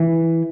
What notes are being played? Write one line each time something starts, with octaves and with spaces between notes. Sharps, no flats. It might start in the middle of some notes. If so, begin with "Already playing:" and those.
Already playing: E3